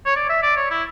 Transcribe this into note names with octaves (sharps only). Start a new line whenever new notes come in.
C#5
D5
E5
D5
C#5
E4